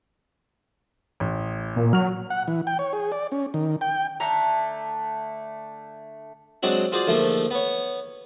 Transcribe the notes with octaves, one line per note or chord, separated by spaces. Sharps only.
A1
A#2
F#3 F6 F7
F#5
E3
G5
C#5
G#4
D5
C#4
D#3
G5
D3 A3 A#5
F#3 G#3 C4 D4 F#4
F4 F#4 G#4 C5 D5
D2 G#2 F3 A3 A#3
B3 C#5